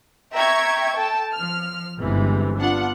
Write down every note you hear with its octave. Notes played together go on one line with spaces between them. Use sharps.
E5 G5 A#5 C#6 G#6
A4 G5 A5
F3 F6
G1 C3 E3 G#3
B3 D4 F4 F#5